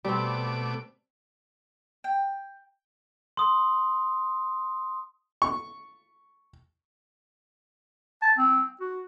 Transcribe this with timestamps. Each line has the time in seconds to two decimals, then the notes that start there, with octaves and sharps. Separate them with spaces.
0.05 B2 G3 A3 C4 D6
2.04 G5
3.37 C6 D#6
5.42 C#6
8.22 A5
8.38 C4
8.81 F#4